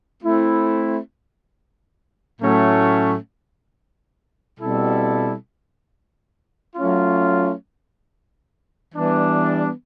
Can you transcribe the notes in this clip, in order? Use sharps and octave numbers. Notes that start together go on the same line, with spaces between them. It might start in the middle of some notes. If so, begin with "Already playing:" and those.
A3 C4 E4
A2 F#3 A3 C#4
B2 G3 C4 E4 A4
F#3 A3 C#4 F4
E3 G3 B3 D4